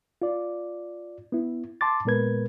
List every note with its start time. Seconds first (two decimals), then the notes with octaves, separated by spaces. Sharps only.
0.22 F4 D5
1.32 B3 E4
1.81 A5 C6 D6 A6
2.05 A#2 G#3 B3 A#4 B4 G#6